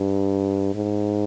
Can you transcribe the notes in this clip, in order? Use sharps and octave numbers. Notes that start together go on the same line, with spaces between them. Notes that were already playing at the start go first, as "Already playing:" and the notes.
Already playing: G2
G#2